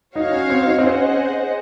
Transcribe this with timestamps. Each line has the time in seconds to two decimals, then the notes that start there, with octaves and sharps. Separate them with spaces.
0.15 D#4 F#4 C#5 F5
0.32 C#4
0.50 C4
0.66 D#4
0.79 C4
0.83 C#4 G#4 C5 D#5 F#5